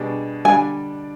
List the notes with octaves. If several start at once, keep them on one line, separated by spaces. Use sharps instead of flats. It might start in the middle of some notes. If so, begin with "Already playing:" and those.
Already playing: B2 G3 D4 G#4
D3 G3 D4 G#5